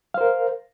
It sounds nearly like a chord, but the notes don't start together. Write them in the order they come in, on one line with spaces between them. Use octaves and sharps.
F5 C5 A#4